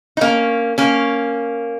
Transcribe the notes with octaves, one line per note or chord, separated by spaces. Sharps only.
D#4
A#3 C#4
A#3 C#4